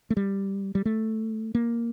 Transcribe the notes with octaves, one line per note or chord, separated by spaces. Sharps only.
A3
G3
G3
A3
A#3